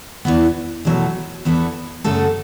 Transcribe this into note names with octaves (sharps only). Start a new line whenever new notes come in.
E2 E3 B3
E2 B2 F#3 A3
E2 E3 B3 E4 A4
F#2 C#3 A3 F#4 A4